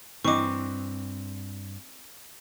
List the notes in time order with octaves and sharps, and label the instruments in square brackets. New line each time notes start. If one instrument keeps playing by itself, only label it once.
[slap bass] G2 [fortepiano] E3 D#5 [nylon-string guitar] C4 [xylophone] C#6 D6